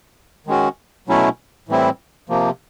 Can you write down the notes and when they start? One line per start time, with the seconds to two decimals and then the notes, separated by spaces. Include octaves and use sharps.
0.47 D#3 G#3 C#4 F#4
1.08 B2 F#3 A3 C#4 E4
1.69 A2 E3 G3 C4 E4
2.29 C3 F3 A#3